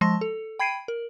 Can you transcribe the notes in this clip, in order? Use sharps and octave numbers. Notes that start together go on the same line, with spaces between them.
F3 G#3 A5 C6 A#6
A4
G5 B5 G#6 C7 D7 D#7
A#4